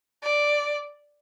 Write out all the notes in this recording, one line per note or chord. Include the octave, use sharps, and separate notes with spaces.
D5